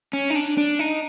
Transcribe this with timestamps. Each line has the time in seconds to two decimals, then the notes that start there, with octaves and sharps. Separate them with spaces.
0.13 C#4
0.30 D#4
0.35 D4
0.57 D4
0.79 D#4